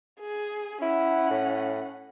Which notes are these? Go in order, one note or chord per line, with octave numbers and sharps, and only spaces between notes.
G#4
C#4 E4 F#5
A2